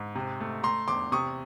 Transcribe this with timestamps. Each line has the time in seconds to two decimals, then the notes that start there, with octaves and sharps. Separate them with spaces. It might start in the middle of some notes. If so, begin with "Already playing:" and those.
Already playing: G#2
0.15 C3
0.40 A3
0.63 A3 A#5 C6
0.88 E2 C6 D6
1.12 C3 C#6 D#6